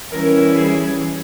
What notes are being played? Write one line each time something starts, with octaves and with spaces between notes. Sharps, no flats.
E3 G3 C#4 E4 A#4
G#4